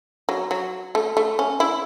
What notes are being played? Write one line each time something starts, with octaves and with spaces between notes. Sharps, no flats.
F#3
F#3
A3
A3
C#4
E4